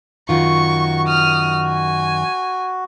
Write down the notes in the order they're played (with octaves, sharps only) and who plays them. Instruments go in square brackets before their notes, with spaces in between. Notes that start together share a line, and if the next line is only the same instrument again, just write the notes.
[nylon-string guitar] F#2 D#3 F4 [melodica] F#4 [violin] C#6
[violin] D#6 F6
G#5